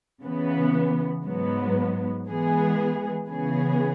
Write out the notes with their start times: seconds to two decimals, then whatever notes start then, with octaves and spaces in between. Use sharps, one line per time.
0.21 C#3 E3 B3
1.24 G#2 F#3 B3
2.26 E3 G#3 B3 G#4
3.29 C#3 E3 B3 G#4